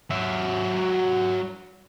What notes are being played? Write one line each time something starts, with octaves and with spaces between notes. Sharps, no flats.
F#3 E5